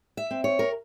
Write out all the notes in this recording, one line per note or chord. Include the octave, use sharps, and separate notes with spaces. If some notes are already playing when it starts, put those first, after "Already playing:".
E5
C4
C#5
A#4